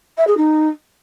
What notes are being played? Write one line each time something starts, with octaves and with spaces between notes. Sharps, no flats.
E5
G#4
D#4